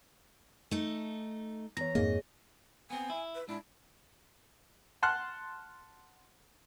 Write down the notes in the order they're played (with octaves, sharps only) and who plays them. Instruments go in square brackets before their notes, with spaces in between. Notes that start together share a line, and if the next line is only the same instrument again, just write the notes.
[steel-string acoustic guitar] A3 D#4
[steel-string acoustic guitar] E2 A#5 [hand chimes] C#5 A#6
[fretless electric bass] F2 G#2 A#3 [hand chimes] G#4 [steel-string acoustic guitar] D#5
[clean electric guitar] B3 C4 [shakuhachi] G#5
[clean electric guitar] E4
[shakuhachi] B4
[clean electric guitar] G#2 D4 [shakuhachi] E4
[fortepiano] F#5 A5 C6 F6 F#6